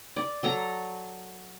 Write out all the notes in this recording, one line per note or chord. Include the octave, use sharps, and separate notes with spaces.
D5
F#3 A4 A#5